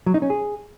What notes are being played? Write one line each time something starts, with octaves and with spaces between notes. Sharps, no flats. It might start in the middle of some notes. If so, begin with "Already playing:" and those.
F#3
D#4
C#4
G#4